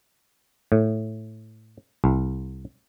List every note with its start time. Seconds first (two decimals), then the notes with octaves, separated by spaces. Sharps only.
0.72 A2
2.04 C2